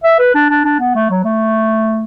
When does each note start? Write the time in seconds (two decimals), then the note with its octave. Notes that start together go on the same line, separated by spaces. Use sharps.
0.04 E5
0.19 B4
0.35 D4
0.50 D4
0.65 D4
0.79 B3
0.95 A3
1.10 F#3
1.25 A3